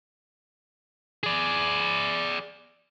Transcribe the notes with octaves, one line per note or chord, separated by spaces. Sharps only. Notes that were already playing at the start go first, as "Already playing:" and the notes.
G#4 D5